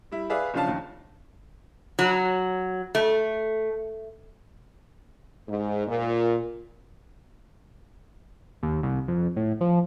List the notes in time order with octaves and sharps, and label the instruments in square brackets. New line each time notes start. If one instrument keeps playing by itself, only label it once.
[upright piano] G3 E4
G#4 B4 D5 E5 F5
F#1 F3 C#4 D4 F5 A5
D#2
[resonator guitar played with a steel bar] F#3
A3
[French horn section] G#2
A#2
[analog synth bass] D#2
C2
F2
A2
F3